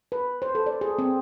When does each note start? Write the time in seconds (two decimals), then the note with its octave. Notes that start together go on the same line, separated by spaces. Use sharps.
0.12 B4
0.42 C5
0.55 A4
0.66 D5
0.81 G#4
0.98 C4